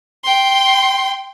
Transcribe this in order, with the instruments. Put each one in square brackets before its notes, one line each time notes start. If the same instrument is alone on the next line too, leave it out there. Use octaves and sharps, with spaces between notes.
[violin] G5 C6